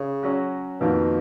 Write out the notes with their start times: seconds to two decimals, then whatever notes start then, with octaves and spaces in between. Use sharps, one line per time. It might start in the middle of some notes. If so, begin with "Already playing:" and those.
Already playing: C#3
0.23 F#3 C#4 F#4
0.81 F2 B2 D#3 A#3 F4